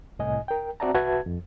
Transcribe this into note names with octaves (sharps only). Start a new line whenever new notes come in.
C2 A2 D#5 G#5
A#4 G5
C4 F#4 D5 E5 A5 A#5
C2 F#4 B4 E5 A5 G#6
F2